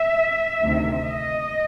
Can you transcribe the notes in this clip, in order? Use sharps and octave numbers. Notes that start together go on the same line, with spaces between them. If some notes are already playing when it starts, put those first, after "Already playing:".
Already playing: E5
D2 C3 D#3
D#5